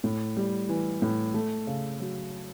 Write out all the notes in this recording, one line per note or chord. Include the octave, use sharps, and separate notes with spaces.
A2
G3
E3
A2
A3
C#3
F#3